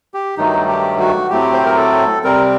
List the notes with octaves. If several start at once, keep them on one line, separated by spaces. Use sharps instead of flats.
G4
G2 D#3 F#3 A3 D#4
G4
F#4
A2 F#3 A3 C4 G4
C5
A#4
A4
C3 G3 C4 A#4